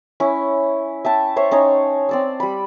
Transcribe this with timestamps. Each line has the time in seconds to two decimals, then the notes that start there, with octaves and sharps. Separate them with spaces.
0.20 C#4 E4
1.05 E5 G5 A5
1.36 C5 C#5 E5
1.51 C#4 D#4 C5 C#5
2.09 C4 D5 E6
2.40 G3 B5